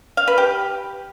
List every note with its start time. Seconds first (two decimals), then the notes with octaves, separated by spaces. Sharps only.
0.17 F5
0.27 B4
0.38 G4